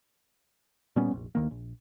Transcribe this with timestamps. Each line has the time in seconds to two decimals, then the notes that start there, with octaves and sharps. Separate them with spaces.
0.96 A#2 G3 B3 C#4
1.11 F1 A#1
1.35 D2 D#3 A#3
1.51 A#1